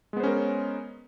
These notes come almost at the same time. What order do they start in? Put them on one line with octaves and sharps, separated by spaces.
G#3 B3 C5 C#4 A#4